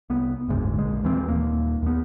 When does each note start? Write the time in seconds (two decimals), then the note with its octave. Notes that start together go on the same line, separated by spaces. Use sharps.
0.10 C2 B3
0.48 F#1 D2 G#2
0.77 A#1 G#3
1.04 D#2 E3 C4
1.28 D#1 D#2 A#3
1.83 D#2 B3